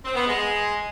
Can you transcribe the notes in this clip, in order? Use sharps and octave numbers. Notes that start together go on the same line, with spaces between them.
C4
B3
G#3